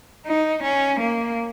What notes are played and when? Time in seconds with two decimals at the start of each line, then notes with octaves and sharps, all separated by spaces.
0.26 D#4
0.63 C#4
1.00 A#3